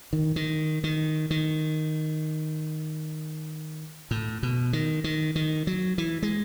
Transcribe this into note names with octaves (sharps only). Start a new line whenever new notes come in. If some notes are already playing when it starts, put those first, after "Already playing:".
D#3
D#3
D#3
D#3
A2
B2
D#3
D#3
D#3
F#3
E3
G#3